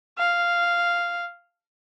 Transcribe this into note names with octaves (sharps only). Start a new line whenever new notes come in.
F5